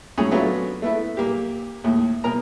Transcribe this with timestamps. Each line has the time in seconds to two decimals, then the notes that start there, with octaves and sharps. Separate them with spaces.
0.18 A2 F#3 C#4 G#4 C#5
0.31 F#3 A3 B3 C#4 D4 F4
0.82 A3 B3 E4
1.17 A#2 A#3 G4
1.84 D#2 A2
2.24 B2 A#4 A#5